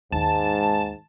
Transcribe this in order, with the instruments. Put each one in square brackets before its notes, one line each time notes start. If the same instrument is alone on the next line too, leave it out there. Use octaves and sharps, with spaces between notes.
[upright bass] D#2 G#3 [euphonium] G#2 [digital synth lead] A5